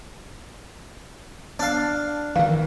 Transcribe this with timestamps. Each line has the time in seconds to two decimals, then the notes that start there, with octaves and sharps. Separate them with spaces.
1.59 D4 F5
2.36 D#3 E3 F5